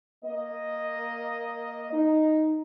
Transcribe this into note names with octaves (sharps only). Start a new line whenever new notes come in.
A#3 D#5
D#4